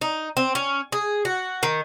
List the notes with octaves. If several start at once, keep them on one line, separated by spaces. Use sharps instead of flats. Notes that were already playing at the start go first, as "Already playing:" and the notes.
D#4
C4
C#4
G#4
F#4
D#3